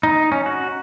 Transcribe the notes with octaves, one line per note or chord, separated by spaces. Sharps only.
D#4
C#4
F#4